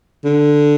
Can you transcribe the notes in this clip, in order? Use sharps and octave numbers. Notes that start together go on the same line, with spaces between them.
D3